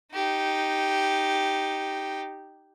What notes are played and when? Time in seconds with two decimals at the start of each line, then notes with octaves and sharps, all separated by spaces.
0.13 D#4 G4